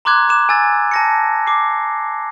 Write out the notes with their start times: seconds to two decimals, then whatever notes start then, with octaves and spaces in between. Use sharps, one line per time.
0.05 A#5 C6 D6 F#6 G#6
0.29 D6 F#6 E7
0.49 G#5 E6 G#6 A6
0.91 A5 A#6 C#7
1.47 D6 C7